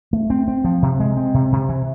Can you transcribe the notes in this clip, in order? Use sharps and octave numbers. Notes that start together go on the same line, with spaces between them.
A3
C4
C4
F3
C3
G#3
C4
C3
C3
E3